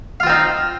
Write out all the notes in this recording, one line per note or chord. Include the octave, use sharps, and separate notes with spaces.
C4 D#4 F4 F5